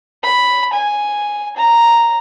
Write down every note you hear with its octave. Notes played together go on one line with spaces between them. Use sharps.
B5
G#5
A#5